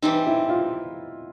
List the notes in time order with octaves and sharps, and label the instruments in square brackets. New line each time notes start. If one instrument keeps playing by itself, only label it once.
[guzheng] E3 G3 C4 [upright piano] D#4
[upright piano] E4
F4